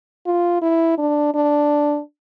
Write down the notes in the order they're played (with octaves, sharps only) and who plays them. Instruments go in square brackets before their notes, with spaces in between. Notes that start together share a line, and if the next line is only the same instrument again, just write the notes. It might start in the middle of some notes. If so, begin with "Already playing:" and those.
[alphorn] F4
E4
D4
D4